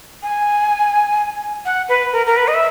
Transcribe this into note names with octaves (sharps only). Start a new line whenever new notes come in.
G#5
F#5
B4
A#4
A#4
B4
D#5
E5